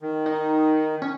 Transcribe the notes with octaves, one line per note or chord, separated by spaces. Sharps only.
D#3
D#4
C#4